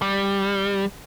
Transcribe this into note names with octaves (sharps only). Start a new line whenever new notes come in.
G3